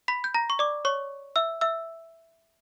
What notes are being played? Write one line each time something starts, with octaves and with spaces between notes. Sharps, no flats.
B5 B6
G6
A#5 A#6
C#6
D5 D6
C#5 C#6
E5 E6
E5 E6